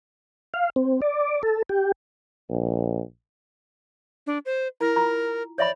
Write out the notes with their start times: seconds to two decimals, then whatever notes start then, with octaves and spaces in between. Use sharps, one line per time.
0.54 F5
0.76 C4
1.02 D5
1.43 A4
1.69 G4
2.50 A#1
4.27 D4
4.46 C5
4.81 E4 A#4
4.96 F4 A#5
5.58 C#5 D5 E5 B5